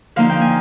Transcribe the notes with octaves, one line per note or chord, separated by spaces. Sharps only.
D3 F3 A#3 D#4 F5
G5
G#5